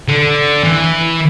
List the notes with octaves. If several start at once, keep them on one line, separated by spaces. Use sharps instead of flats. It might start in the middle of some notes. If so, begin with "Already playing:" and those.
D3
E3